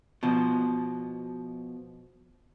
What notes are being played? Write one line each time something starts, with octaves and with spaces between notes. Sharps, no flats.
B2 F3